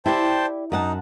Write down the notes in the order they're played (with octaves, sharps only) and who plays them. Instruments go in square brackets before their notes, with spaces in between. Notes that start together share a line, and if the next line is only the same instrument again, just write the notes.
[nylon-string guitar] E4 G4 D5 [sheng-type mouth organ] C5 G5 A5
[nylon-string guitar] F#2 F#5 A5 [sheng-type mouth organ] D#4